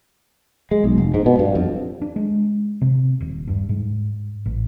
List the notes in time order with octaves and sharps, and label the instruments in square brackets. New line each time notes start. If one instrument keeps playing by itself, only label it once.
[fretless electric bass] G#3
B1
F1
G#2
B2
G2
F2
[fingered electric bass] D4
G#3
C3
D#1
G2
G#2
A1